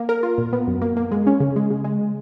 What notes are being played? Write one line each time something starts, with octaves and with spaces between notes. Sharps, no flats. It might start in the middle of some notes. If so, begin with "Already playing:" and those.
Already playing: A#3
A#4
F4
A#2
B3
F#2
A#3
A#3
G#3
C#4
C#3
G#3
C#3
G#3